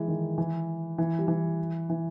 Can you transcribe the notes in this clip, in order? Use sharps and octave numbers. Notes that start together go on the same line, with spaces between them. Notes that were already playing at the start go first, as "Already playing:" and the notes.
Already playing: E3 G#3
D#3
E3
E3
G3
E3
E3